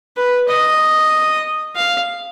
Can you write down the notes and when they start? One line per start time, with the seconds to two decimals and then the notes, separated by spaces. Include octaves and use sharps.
0.17 B4
0.48 D#5
1.76 F5